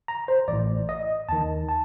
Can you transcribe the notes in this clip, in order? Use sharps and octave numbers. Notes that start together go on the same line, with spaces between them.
A#5
C5
A1 A2 D5
D#5
D#2 D#3 A5
A5